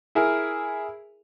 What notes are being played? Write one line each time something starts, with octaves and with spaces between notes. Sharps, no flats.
E4 G#4 A#4